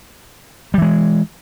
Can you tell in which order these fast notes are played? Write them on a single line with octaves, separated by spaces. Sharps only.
G3 E3 G#3